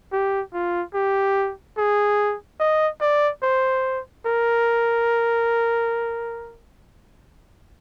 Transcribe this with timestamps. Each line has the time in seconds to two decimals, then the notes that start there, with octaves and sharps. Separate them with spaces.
0.12 G4
0.54 F4
0.94 G4
1.77 G#4
2.60 D#5
3.01 D5
3.42 C5
4.25 A#4